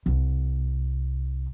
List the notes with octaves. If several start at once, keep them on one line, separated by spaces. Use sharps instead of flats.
C2